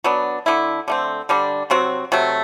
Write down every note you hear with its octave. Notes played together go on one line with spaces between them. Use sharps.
F#3 B3 D4
D3 A3 E4
D3 A3 C4
D3 G3 D4
C3 F#3 C4 F#4
C3 F#3 A3